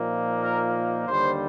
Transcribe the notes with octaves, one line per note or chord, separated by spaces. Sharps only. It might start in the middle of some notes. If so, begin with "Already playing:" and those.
Already playing: A#2 F3 A#3 D#4
A#4
D#2 D3 G3 C5